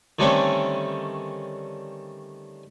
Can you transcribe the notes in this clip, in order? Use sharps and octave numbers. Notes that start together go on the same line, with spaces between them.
D3 D#3 G3 A3 C4 C#4